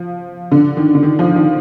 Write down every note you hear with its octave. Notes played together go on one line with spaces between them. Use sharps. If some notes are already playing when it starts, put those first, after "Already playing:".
Already playing: F3
D3
D#3
D3
D#3
F3
D#3